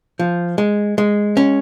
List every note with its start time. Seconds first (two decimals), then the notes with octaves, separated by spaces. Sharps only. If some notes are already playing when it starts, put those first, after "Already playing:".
0.19 F3
0.58 G#3
0.98 G#3
1.37 C#4